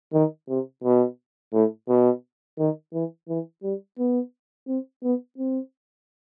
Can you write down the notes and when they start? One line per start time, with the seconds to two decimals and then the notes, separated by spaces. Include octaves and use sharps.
0.13 D#3
0.49 C3
0.83 B2
1.53 A2
1.88 B2
2.58 D#3
2.93 E3
3.28 E3
3.63 G3
3.99 B3
4.67 C4
5.03 B3
5.38 C4